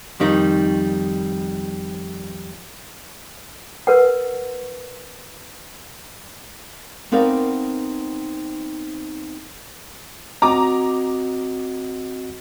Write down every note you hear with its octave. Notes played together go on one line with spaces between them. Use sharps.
F2 D#3 G3 D#4
A#4 B4 F#5
B3 C4 D#4 A#4 D5 F5
C4 F#4 D#5 A#5 D6